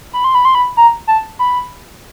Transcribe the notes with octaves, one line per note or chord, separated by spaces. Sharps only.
B5
C6
B5
C6
B5
A#5
A5
B5